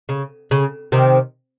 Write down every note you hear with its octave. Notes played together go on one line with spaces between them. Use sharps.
C#3
C#3
C3 D#3